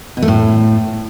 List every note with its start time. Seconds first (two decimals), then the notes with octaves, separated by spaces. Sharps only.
0.17 B2
0.22 A3
0.28 A2